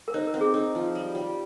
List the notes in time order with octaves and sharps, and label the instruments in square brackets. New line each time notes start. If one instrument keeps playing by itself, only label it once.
[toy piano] A#4
[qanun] D#4 [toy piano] C5
[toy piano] A#4
[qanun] C4
[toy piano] G#4
[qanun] D#4
F3
G3
G3